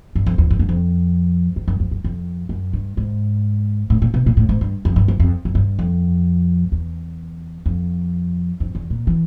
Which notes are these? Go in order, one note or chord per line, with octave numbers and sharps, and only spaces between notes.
G2
F2
E2
F2
F#2
F2
F2
F#2
F2
F#2
F2
F#2
G2
G#2
A2
A#2
B2
A#2
A2
G#2
G2
F2
G2
F#2
F2
F#2
G2
F2
E2
F2
F2
E2
A#2
E3